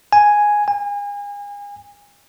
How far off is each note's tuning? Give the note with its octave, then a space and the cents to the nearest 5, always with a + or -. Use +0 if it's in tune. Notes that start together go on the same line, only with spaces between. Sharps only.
G#5 +0
G#5 -35